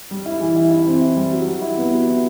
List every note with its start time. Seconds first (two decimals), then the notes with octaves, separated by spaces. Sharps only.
0.11 G3
0.25 E4
0.40 E3
0.56 E4
0.71 E4
0.86 C4
1.01 E4
1.16 G3
1.32 F#3
1.47 F#3
1.62 E4
1.77 B3
1.92 F#3
2.08 E4